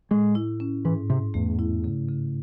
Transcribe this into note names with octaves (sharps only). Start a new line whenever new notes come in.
A2 G#3
E4
C#4
G#2 E3
G#2 C3
E2 A3
E4
C#3
C#3